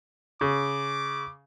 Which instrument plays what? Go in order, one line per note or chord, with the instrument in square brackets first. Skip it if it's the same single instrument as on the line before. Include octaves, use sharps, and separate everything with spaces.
[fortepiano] C#3 [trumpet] D6